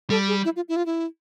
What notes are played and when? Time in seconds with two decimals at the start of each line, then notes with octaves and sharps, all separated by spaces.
0.10 G3 A4
0.28 G#4
0.45 E4
0.56 F4
0.69 E4
0.76 F4
0.86 E4